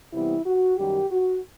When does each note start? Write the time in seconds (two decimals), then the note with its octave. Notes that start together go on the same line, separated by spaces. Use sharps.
0.13 C3 E3 G3 B3 E4
0.46 F#4
0.78 F#2 D#3 G3 G4
1.11 F#4